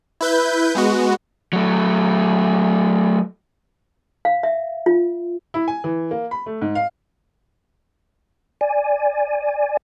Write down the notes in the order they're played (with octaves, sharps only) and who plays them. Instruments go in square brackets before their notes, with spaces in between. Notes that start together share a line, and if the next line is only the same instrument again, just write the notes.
[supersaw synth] E4 B4 G6
G#3 B3 F#4
[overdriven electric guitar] F#3 A3
[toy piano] F5
E5
F4
[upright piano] E4
G#5
E3
A#3
B5
A3
G#2
F5
[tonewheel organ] D5 G#5